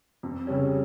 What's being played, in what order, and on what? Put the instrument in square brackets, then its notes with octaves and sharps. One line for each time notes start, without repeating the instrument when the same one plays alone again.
[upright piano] F2
C#3 G3 C#4